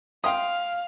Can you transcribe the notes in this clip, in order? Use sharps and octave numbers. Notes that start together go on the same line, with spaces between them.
F5 G5 C6 D#6